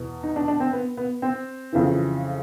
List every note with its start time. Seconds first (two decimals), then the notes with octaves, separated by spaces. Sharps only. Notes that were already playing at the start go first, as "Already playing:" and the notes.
Already playing: E2 B2
0.23 D#4
0.36 D4
0.48 D4
0.60 C4
0.73 B3
0.97 B3
1.22 C4
1.73 F2 C#3 E3